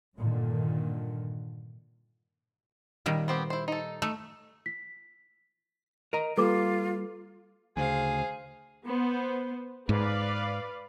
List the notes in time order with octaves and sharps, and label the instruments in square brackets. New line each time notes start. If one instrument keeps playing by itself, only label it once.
[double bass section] G2 A#2 D3 D#3
[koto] A#2 D#3 G3
[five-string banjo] B3 C4 G4
E4 C5
D#4 A4
[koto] A3 [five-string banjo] D#4
[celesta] B6
[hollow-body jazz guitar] A#4 D#5 A#5 [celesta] D7
[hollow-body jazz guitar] G3 A#3 [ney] F4 [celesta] A4 B4 D6
[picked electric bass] D2 [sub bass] C#3 [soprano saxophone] G#4 [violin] C5 F5
[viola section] B3 C5
[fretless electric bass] G#2 [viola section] B4 D5 F5